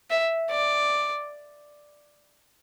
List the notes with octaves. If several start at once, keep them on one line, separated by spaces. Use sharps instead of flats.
E5
D5